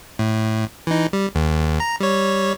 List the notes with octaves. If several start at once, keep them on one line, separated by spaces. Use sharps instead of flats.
A2
E3 D#4
G3
D#2
A#5
G3 C#5